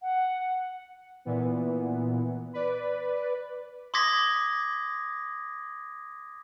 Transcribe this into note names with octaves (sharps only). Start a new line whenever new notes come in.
F#5
A#2 E3 B3
B4 D5
C6 D6 D#6 G#6 A#6 B6